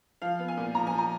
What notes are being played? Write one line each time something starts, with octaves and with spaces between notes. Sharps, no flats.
F3 F5
B3
G#5
A#2
F3 A#5
G#5
F3
A#5